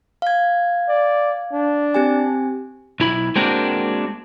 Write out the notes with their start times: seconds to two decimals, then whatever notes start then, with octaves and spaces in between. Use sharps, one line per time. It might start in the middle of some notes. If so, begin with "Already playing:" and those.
0.22 F5 G#6
0.88 D5
1.53 D4
1.94 C4 G4 G#5
3.00 B1 E4 B5
3.36 G#3 A#3 C4 D4 F#4 A#4